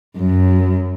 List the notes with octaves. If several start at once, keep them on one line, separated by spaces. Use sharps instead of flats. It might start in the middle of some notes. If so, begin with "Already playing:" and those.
F#2